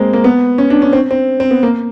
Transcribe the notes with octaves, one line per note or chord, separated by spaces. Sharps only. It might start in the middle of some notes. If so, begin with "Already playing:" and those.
Already playing: G#3 A#3 C4
A#3
B3
C#4
D4
C#4
C4
C4
C4
B3
A#3